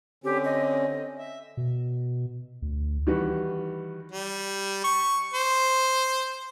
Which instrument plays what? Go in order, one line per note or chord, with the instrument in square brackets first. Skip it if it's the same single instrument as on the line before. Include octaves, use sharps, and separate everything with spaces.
[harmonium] D3 C4 C#4 [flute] G4
[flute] D#5
[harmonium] E5
[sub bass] B2
D2
[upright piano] D#3 E3 G3 F#4 B4
[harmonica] G3
C#6
C5